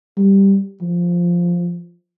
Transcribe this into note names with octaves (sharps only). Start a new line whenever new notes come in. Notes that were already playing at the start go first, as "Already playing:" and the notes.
G3
F3